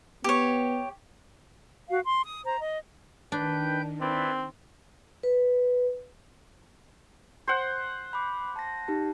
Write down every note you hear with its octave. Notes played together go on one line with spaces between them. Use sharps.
B3 G4 C#5
F#4 F5
C6
D#6
C5 A#5
D#5
D#3 D4 B4 G5 G6
C4 E4 B4 D5
B4
C5 F#5
B5 D6
A5 A#6
D#4 G4 A5